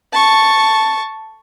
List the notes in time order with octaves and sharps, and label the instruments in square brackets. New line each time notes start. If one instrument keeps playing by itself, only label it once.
[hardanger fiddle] A5 C#6